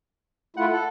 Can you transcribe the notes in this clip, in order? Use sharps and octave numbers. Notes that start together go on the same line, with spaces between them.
A3 E4 F4 F#5
A4